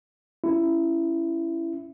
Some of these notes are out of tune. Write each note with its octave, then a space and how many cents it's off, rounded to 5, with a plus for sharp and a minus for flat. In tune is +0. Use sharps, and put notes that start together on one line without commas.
C#4 +0 E4 +15